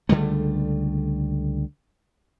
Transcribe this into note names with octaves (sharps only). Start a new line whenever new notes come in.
C#2 D3 G3 A3